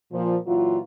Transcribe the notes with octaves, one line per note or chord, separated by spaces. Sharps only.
A#2 F3
A#2 E3 F#3 F4